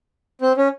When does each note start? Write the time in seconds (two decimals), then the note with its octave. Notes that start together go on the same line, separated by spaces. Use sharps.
0.42 C4
0.57 C#4